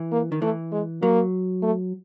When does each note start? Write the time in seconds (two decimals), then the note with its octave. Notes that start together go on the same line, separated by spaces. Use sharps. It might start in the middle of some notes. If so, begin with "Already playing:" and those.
Already playing: E3
0.12 A#3
0.32 D#3
0.42 E3 A3
0.72 G#3
1.02 F#3 A#3
1.63 A3